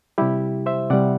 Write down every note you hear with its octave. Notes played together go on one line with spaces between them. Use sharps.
C3 G3 E4 G4
C5 E5
C3 G3 D5 F#5